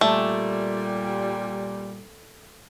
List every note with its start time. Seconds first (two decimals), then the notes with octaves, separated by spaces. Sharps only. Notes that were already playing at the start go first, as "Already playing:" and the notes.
0.01 A#2 G3 A3